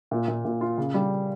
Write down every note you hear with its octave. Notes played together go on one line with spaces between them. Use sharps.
A#2
A#2
A#2
F4
C#3
G3